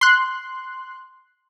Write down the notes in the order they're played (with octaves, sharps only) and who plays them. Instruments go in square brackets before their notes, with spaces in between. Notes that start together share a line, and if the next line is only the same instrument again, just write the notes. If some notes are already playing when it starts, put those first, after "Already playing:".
[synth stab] C6 F#6